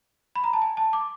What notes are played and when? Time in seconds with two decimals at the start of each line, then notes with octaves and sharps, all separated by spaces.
0.36 B5
0.44 A#5
0.53 A5
0.62 G#5
0.77 A5
0.93 D6